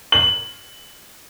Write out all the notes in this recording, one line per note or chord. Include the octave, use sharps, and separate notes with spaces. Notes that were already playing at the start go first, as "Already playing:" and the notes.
F#7